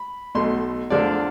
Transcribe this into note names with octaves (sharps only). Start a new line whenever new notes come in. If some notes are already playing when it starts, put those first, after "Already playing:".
Already playing: B5
B1 B2 A3 C6
E2 D3 F3 A3 D4 D5